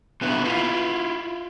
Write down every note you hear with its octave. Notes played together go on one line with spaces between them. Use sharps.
A#2 D3 B3 E4
E4 F4